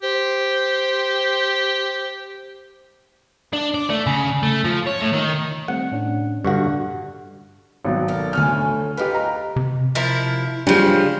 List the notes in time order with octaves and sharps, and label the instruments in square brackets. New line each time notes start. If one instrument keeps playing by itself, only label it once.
[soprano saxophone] G4 [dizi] C5
[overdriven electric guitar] D4
D5
A3
C#3
A3
F3
C#5
A2
D#3
[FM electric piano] G3 A3 C4 [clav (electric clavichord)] F#5
[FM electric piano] A2 C#4 D4
[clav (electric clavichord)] G2 D3 F#4 [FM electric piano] F5 F#5 C#6
[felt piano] G#1 B2 F#3
[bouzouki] A4 A#4
[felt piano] D2 F6 [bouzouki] C#4 A4 G#5
[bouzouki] D#4 F4 A#4 [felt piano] G4 B4
[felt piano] A#5
[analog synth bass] C3
[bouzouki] F3 E4 A#4
[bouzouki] C#3 F3 [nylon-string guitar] G3 G#3 F4 [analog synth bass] D4